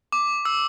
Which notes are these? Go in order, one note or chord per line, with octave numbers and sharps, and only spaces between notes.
D6
E6